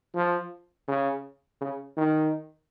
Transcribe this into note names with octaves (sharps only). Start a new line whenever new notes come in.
F3
C#3
C#3
D#3